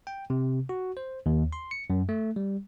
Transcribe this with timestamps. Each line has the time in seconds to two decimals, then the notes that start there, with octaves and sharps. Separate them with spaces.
0.07 G5
0.30 C3
0.69 F#4
0.97 C5
1.26 D#2
1.53 C6
1.71 C#7
1.90 F#2
2.09 A3
2.36 G3